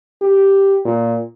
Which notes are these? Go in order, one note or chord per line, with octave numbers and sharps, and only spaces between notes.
G4
A#2